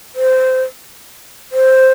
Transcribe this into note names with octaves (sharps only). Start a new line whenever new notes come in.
C5
C5